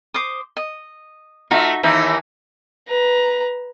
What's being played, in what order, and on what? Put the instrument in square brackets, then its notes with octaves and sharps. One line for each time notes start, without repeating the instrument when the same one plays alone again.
[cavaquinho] C5 D6 D#6
D#5
[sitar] A3 F4 [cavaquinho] D#4 F#4 E5
[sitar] D#2 E3 D#4 [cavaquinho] E5
[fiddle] B4 A#5